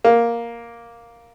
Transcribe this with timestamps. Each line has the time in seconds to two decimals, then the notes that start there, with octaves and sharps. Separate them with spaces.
0.05 A#3